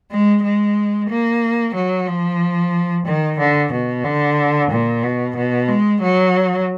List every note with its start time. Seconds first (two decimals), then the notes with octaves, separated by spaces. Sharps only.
0.11 G#3
0.43 G#3
1.10 A#3
1.75 F#3
2.07 F3
3.06 D#3
3.38 D3
3.72 B2
4.04 D3
4.70 A#2
5.03 B2
5.36 B2
5.68 G#3
6.02 F#3